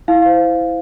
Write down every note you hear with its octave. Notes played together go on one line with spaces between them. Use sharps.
E4 F5
C5 F5